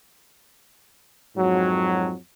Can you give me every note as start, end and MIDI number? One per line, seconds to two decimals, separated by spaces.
1.36 2.14 41
1.36 2.14 44
1.36 2.14 54